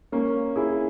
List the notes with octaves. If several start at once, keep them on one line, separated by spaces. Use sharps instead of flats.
A#3 C#4
E4 G#4